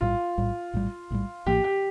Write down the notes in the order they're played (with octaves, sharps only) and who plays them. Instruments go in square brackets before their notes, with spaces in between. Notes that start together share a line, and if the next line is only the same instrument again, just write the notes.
[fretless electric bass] A#1 A2 G3 [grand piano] F4
[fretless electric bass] A#1 A2 G3
A#1 A2 G3
A#1 A2 G3
[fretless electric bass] A#1 A2 F3 A#3 [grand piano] G4
[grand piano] G4